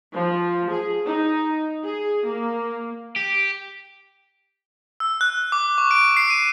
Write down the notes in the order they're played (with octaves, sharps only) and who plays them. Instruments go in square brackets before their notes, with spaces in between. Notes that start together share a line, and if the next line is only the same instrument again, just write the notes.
[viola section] F3
G#4
D#4
G#4
A#3
[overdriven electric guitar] G4
[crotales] E6
F#6
D6
C#6
D7
C7
D#7